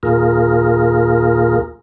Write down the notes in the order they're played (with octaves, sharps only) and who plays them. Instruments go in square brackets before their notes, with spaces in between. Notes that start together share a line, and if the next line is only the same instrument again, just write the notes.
[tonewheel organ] D#2 A#2 F4 G#4 A#4